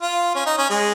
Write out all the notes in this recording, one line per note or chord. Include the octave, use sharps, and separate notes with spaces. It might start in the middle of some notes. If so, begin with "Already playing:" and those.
F4
C#4
D#4
C#4
G#3